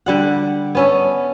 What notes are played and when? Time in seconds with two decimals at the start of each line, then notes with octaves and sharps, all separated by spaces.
0.06 D3 G3 F#5
0.75 B3 C#4 A4